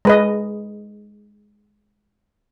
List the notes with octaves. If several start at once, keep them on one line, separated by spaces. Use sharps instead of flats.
G#3 B4 D#5